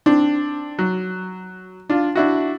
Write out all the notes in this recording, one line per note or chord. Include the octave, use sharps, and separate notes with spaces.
C4 D4
F#3
D4 F4
D4 E4 F#4